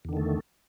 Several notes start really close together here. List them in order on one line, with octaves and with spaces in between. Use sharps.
E2 D3 D#3 A3